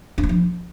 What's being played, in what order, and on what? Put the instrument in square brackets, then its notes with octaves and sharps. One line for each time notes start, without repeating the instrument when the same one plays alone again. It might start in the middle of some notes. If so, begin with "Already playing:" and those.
[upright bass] D4
A#3
F3